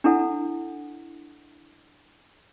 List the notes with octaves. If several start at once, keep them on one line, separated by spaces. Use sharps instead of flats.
D4 E4 A4 F#5